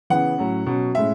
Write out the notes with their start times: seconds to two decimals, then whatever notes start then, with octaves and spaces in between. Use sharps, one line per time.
0.10 C#3 E3 B3 F#5
0.38 A2 F#3 C#4
0.67 B2 F#3 C#4
0.95 A2 G#3 C#4 E5